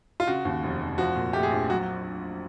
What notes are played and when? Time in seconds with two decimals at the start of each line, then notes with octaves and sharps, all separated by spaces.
0.20 F4
0.27 C#3 F#4
0.45 D#2
0.63 F1
0.81 F1
0.98 F3 F#4
1.16 A#2
1.33 A3 G4
1.43 G#4
1.51 A#1
1.70 F#3 F#4